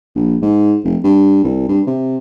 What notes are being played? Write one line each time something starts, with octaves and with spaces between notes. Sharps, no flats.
A#1
G#2
F1
G2
C2
G2
C3